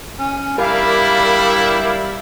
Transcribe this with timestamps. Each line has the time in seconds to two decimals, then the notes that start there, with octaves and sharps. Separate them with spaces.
0.19 C#4
0.58 G3 D4 E4 A#4 F5 D6